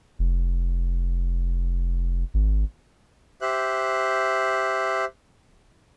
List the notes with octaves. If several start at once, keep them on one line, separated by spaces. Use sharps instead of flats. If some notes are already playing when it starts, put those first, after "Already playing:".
F1
G#1
G4 C5 E5 F#6